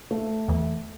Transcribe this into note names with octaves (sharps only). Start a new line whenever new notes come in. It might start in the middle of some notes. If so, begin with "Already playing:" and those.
A3
E2 E3